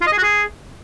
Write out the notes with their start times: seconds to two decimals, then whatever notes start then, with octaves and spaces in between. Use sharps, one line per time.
0.01 F4
0.07 D#5
0.12 G#4
0.17 F#4
0.23 G#4